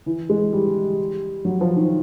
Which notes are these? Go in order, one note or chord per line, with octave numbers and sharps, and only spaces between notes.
E3
G#3
G3
F#3
F3
D#3